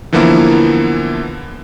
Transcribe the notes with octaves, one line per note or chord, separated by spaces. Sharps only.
D3 E3 F3 A#3 B3 E4